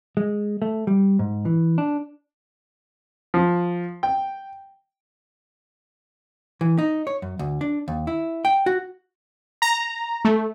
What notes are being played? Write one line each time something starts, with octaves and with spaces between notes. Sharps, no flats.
G#3
A3
G3
G#2
E3
D4
F3
G5
E3
D#4
C#5
F#2
D2
D4
D#2
E4
G5
F#4
A#5
A3